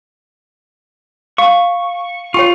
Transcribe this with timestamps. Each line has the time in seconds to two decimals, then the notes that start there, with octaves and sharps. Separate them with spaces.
1.38 F5 C#6
2.34 F4 C#5 G5 C#6